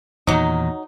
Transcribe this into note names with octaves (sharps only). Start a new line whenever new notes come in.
E2 A#2 D#3 F#3 D#4